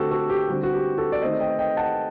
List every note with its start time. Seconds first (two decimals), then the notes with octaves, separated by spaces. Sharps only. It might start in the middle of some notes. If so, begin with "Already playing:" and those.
Already playing: D3 A3 C4 F#4 G4 A4
0.11 F#4 A4
0.30 G4
0.48 D3 G3 C4 F#4
0.63 F#4
0.73 G4
0.98 F#4 A4
1.12 D5
1.22 D#3 A3 C4 C5 D#5
1.40 D#5 G5
1.59 D#5 G5
1.77 F#5 A5